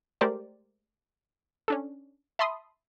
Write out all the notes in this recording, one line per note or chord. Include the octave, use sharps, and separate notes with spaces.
G#3 A3 G4 A#4 C5 D5
C#4 D4 A4
E5 A5 B5 C6 D#6